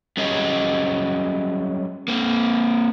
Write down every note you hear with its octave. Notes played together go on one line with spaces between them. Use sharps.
F#3 G3 C#4 G#4 D#5
A#3 C4